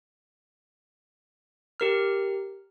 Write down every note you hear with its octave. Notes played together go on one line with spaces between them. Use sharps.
G4 A#4 F6